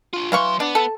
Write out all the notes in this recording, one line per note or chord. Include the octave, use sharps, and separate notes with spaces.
D4 F4
E3 F#3 F5 C6 C#6
B3 D4
A4